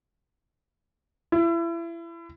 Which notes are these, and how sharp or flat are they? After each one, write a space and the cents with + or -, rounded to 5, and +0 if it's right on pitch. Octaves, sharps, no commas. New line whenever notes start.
E4 +30